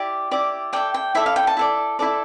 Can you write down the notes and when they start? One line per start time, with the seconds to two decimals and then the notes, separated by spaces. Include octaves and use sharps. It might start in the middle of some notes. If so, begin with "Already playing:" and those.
Already playing: E4 G4 D5
0.31 E4 G4 D5
0.73 E4 A4 D5 G5
0.94 G5
1.15 E4 A4 D5 E5
1.26 F5
1.36 G5
1.47 A5
1.57 E4 A4 D5
1.99 E4 A4 D5